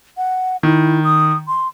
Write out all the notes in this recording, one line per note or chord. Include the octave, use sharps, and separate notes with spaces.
F#5
D#3 E4
D#6
C6